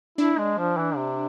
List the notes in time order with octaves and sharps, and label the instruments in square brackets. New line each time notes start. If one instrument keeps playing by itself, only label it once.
[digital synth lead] D4 [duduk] E4
[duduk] G#3
F3
E3
C3